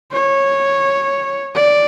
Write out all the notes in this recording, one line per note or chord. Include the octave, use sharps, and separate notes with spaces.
C#5
D5